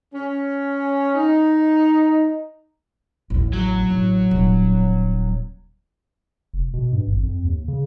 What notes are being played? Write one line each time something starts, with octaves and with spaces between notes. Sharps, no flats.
C#4
D#4
A1 D#2
F#3
A1
D#1
F1
B2
G2
G#1
F2
D#2
C#3